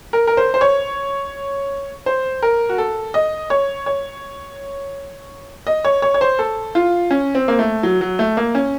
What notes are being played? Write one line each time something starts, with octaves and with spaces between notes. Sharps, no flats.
A#4
A#4
C5
C5
C#5
C5
A#4
F#4
A4
D#5
C#5
C#5
D#5
C#5
C#5
C#5
C5
A4
F4
C#4
C4
A#3
A3
F#3
F#3
A3
A#3
C#4